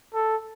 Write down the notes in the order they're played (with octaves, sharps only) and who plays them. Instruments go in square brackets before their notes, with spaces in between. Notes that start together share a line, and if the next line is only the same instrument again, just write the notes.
[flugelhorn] A4